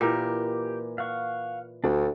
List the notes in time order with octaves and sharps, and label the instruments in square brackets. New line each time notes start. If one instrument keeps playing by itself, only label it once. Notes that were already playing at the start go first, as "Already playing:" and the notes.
[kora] A#2 E3 A#4 [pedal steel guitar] G4
[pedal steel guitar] F5 F#5 C#6
[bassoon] D2 [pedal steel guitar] D4 F#4 A4